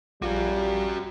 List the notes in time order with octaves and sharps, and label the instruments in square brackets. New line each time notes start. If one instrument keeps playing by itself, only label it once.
[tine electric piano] A#1 F5 [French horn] G3 [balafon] F4 [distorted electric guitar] F#4 A#4